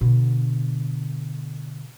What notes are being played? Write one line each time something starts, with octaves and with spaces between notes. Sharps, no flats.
B2 D3